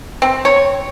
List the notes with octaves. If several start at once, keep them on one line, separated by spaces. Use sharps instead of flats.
C4
C#5